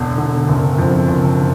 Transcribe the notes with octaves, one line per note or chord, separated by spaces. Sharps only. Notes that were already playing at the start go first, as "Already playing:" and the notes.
Already playing: E1 D3
D3
F#1
F2
F#1